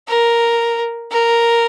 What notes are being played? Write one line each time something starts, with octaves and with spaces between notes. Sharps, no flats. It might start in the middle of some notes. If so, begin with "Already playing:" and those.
A#4
A#4